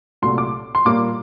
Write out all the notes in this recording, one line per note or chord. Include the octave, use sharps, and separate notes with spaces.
C2 A#2 F#3 A3 C6
D6
C6
A#2 G3 A#3 D6